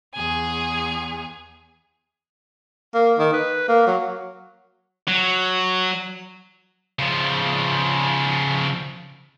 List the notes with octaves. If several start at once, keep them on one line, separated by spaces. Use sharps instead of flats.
E2 G#4 G#5
A#3
D#3
B4
A#3
F#3
F#3
C#3 F3